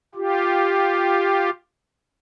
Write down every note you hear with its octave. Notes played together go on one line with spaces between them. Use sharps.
F4 G4